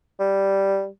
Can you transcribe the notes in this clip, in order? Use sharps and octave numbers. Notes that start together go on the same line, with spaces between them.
G3